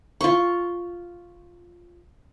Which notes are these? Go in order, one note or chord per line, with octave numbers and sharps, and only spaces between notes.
F4 C#6